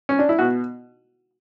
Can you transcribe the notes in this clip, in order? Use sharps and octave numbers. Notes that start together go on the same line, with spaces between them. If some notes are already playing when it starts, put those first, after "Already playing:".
C#4
D4
E4
B2 F#4